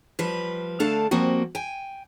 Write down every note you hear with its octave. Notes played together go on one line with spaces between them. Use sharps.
F3 G3 B4
D3 A3 D4 A4 F5 A5
F3 G3 A#3 C4 F#4
G5 G#5